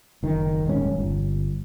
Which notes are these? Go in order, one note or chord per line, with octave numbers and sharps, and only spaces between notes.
F#1 D#3
D#1 E2 G#2 C#4
G1